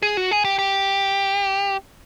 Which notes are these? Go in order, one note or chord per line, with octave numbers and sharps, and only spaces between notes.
G#4
F#4
G#4
G4
G4